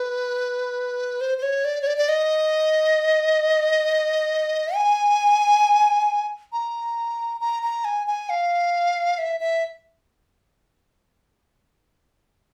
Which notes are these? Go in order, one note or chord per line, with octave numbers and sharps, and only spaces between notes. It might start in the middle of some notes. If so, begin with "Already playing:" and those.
Already playing: B4
C5
C5
C#5
D5
C#5
D5
D5
D#5
G#5
A#5
A#5
A#5
G#5
G#5
F5
E5
E5